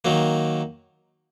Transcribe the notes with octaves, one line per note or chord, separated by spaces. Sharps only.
D#3 F#3 A#3